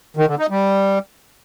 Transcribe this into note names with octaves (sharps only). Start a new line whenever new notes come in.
D#3
D3
D#4
G3